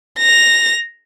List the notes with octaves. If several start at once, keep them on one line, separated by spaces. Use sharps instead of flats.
A#6 F7